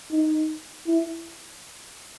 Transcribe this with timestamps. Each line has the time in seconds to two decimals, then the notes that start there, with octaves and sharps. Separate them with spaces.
0.11 D#4
0.87 E4